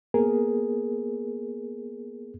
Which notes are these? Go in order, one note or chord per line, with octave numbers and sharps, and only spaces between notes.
A#3 B3 G#4 A#4